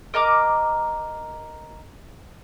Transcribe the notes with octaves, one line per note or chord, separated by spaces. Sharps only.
A#4 D#5 A#5 D6